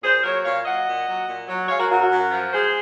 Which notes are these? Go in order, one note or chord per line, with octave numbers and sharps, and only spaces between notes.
A#2 G#4 C5
F#3 A#4 C#5
A#2 C#5 F5
F#3 D#5 F#5
A#2
F#3
A#2
F#3
G#3 C#5 F5
F#4 A#4
F#2 F#4 A#4
F#4 A#4
F#2
F3
G#3 G#4 C5